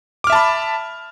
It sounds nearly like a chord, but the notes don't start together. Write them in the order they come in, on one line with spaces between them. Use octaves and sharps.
D6 F6 E5 A5 B5